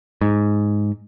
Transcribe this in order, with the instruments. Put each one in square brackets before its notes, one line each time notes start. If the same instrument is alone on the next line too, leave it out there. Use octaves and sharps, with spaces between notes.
[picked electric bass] G#2